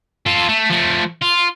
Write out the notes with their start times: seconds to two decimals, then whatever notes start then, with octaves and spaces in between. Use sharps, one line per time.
0.26 F4 A4
0.48 A3
0.70 F3 A3
1.22 F4